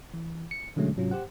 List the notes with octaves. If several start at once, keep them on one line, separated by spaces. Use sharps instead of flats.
E3
C#7
B2 D3 F#3 G#3 A3 C#4
G#2 C3 F#3 C#4 F4
G4 C5 F#5